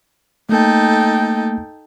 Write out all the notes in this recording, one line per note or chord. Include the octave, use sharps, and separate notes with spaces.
A3 A#3 D#4 A4 G5